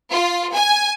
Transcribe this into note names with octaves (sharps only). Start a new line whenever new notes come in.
F4
G#5